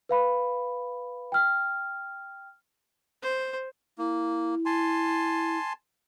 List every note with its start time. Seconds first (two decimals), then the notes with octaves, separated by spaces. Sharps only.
0.09 B4 F5 B5
1.32 G5 F6
3.23 C5
3.98 A#3 E4
4.66 G#5 A5 C6